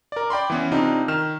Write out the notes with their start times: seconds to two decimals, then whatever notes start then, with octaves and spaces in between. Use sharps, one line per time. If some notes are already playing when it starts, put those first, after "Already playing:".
0.12 A#4 D5
0.30 D5 G5 B5 C6
0.50 E3 B3 C#4
0.71 C3 C4 D4 D#4 F4
1.08 D#3 F6 E7